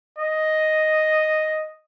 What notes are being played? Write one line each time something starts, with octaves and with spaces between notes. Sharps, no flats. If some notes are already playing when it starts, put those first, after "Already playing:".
D#5